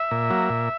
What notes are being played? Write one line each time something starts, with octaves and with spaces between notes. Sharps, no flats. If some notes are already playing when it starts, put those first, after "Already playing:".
Already playing: E5
A#2
F#3 A#3
A#2